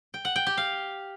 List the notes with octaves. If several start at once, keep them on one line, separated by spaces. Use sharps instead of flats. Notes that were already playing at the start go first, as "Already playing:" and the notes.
G5
F#5
G5
G4
F5